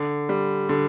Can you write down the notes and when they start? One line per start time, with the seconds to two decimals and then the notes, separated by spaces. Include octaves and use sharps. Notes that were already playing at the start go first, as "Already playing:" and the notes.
Already playing: D3
0.29 G3
0.69 D3